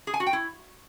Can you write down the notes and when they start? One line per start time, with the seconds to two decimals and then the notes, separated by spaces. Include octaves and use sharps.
0.07 G#4
0.14 G#5
0.20 F#4
0.27 G5
0.33 E4